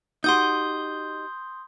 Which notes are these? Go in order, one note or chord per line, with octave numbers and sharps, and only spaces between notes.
D#4 F#4 G4 C6 D#6 G6